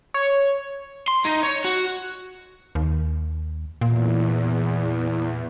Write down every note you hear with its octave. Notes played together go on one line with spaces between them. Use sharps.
C#5
C6
D#4
C#5
F#4
D#2
E2 A#2